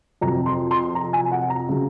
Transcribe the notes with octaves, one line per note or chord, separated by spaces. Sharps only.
F2 C3 F#3 A#5
C6
C6
A#5
G#5
F#5
A#5
C#3 F#3